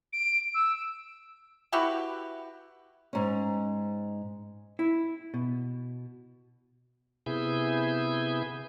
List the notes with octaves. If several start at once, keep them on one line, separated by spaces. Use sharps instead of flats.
D7
E6
E4 F#4 G4 B4
G#2 C#4
E4
B2
C3 B3 E4 G#4 G#5 G6